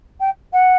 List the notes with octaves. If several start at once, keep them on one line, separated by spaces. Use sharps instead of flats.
G5
F#5